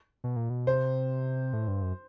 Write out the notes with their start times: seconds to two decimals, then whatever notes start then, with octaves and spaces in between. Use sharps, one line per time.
0.24 B2
0.36 A#2
0.50 B2
0.67 C3 C5
1.53 A2
1.68 G2
1.83 F#2